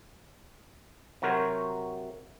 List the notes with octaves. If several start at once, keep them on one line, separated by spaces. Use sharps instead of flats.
C3 F#3 F#4 A#4 C5 C#5